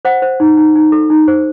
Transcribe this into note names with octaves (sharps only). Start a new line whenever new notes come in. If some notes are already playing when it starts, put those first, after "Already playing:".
C5 F#5
C5
D#4
D#4
D#4
A4
D#4
C5